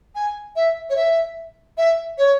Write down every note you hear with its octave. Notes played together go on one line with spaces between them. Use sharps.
G#5
E5
C#5
E5
E5
C#5